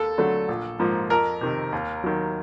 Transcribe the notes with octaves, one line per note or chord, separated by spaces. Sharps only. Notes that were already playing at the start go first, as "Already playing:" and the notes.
Already playing: D#2 A4
D3 F#3 A3
A#1
G#2 F3 A#3
F2 A#4
C3 D#3
D#2
D#3 F#3